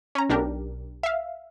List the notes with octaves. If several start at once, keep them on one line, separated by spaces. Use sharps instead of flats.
C#4 A#5
B1 D4 G4 A#4
E5 F5